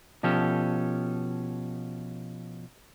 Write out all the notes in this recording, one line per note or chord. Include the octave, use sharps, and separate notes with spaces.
B2 F3 C#4 G4 A4